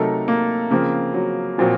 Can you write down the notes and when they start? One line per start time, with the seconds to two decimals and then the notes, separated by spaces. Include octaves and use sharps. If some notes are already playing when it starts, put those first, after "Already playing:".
Already playing: C3 F#3 A3 D#4 A4 A#4
0.28 A#3
0.71 C#3 F3 A#3 C4
1.14 F#3
1.58 A#2 F3 F#3 C4 F#4